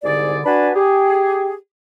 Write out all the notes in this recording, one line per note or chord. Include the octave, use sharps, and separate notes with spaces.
C2 G#2 D3 G#4 D5
D4 F#4 B4 G#5 A5 B5
G4 G#4